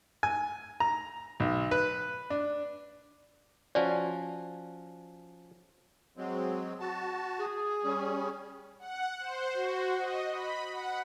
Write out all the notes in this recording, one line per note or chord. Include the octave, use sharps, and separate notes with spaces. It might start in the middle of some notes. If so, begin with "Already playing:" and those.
G#5
A#5
B1
B4
D4
F3 C#4 F#4 D5
F#3 G#3 C4
F#4 A5
G#4
G3 C#4
F#5
C5
F#4
D#5
B5
F#5